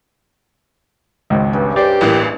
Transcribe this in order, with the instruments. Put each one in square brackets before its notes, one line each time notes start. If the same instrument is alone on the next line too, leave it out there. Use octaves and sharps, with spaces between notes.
[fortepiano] G#1 C#2
[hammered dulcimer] G2 C#3
[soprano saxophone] G4 [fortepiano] C5 D5
[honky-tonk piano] A1 E3 A#3